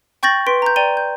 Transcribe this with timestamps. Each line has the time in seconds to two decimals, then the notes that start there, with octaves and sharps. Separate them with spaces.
0.23 G5 C#6 G6 A6 A#6 F#7
0.47 B4 C6 B6 D7
0.62 A#5 G6
0.76 D5 G5 A#5 D#7 G7
0.97 G6